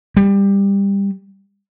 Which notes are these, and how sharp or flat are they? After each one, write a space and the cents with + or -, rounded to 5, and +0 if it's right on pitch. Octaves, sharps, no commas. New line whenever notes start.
G3 +20